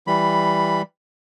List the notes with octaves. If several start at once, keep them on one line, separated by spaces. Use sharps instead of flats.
E3 G3 B5